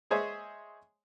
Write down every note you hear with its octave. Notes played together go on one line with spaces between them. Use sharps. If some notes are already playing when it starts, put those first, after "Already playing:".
G#3 G#4 C5 C#5 E5